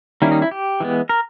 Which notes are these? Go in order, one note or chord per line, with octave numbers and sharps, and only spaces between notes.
D#3 G3 A#3 C#4 E4
D#4
E4
G4
E3 G#3 B3
A#4